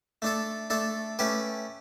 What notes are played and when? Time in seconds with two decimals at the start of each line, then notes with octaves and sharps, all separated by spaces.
0.22 A3 D4 A4
0.70 A3 D4 A4
1.19 A3 C#4 G4 B4